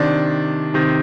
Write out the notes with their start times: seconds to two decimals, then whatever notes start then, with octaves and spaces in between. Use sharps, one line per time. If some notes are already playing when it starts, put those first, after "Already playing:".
Already playing: C3 D#3 D4
0.74 C3 D#3